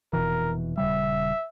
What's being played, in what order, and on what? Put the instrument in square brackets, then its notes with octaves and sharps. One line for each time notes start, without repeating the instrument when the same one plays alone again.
[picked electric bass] F1 B2 E3 [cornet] A#4
[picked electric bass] D#1 C#3 G3 [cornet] E5